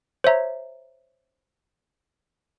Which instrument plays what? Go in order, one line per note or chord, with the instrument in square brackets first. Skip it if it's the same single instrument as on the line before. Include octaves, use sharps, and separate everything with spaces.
[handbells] C5 C#5 E5 A#5